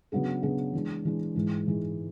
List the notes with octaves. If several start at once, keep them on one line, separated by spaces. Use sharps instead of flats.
C#3 F#3 B3 D4 G#4
C#3 F#3 B3 D4 G#4
E3 G#3 D4
E3 G#3 D4
G#2 E3 G#3
G#2 E3 G#3